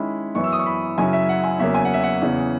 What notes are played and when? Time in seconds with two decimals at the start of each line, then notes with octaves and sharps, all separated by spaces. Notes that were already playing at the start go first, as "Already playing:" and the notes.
Already playing: D#3 G#3 C#4 E4 B5
0.35 F#2 E3 B3 E4 C#6
0.44 E6
0.52 D#6
0.59 C#6
0.66 B5
0.98 F#2 C#3 F#3 C#4 E4 G#5
1.13 E5
1.29 F#5
1.44 G#5
1.59 E2 C#3 F#3 A#3 E5
1.74 G#5
1.85 F#5
1.94 E5
2.03 F#5
2.22 E2 C#3 E3